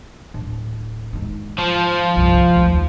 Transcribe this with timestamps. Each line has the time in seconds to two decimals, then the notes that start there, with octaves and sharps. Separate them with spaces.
0.34 D1
1.13 G#2 D#3
1.58 F3
2.16 C2 G2
2.54 D#2 A3